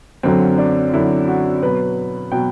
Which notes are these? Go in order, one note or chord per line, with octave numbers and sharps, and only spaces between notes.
F#2 D3 F#3 C4
D4
F#2 D3 F#3 E4
F#4
B2 F#3 B4
B2 F#3 G5